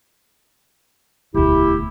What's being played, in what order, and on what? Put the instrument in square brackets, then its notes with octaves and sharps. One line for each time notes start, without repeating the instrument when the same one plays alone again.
[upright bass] E1 D2 [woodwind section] E4 G4